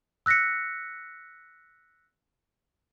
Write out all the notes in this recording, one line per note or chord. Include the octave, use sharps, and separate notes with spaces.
E6 F#6 A#6 B6 C#7